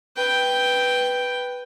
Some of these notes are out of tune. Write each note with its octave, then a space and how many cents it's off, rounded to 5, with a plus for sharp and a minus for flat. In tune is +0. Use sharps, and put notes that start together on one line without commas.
B4 +0 G5 +0